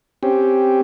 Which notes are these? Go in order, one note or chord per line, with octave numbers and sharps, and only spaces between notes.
C4 C#4 G4